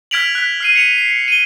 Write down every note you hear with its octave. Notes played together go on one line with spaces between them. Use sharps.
F6 G#6 B6 D7 F7 F#7
F#6 B6
F6 C7 D#7
C#7 F7
C7
D#7 G7